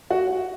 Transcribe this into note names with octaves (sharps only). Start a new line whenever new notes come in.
F#4